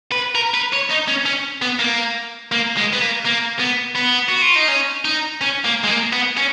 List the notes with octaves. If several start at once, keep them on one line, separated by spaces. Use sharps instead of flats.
B4
A#4
B4
C#5
D#4
C#4
C#4
B3
A#3
A#3
G#3
B3
A#3
A#3
B3
B3
F#4
F4
D#4
C#4
D#4
C#4
A#3
G#3
A#3
B3
C#4